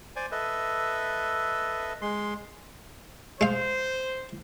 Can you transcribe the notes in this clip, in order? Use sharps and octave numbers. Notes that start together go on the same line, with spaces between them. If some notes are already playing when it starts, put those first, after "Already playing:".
C5 D5 G#5
A4 B4 D#5 E5
G#3 C6
G#3 C5 F5